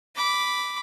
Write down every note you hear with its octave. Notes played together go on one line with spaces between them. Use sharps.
B5 D6